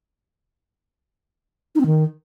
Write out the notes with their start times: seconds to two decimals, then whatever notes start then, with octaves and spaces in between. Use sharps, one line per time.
1.75 D#4
1.81 C4
1.86 D#3